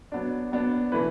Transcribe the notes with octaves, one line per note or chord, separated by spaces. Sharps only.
F#3 B3 D4
F#3 B3 D4
E3 A3 E4 B4